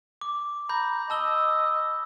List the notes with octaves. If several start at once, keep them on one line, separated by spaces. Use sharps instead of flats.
D6
A#5 B5 G6
D#5 A5 E6 G7